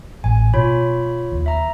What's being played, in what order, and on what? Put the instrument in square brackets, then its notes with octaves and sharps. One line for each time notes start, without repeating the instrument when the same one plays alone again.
[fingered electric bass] A1 [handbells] G#5
[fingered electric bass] B2 [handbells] F4 C#5 B5
[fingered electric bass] D#2
[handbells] E5 A#5